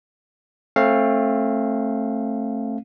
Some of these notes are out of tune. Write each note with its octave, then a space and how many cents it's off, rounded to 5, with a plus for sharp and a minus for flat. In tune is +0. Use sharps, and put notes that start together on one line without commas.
A3 +0 C4 +35 F5 +0